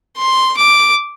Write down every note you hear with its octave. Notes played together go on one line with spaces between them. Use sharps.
C6
D6